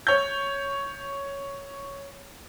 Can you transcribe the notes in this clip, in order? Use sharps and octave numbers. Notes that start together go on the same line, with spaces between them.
C#5 G6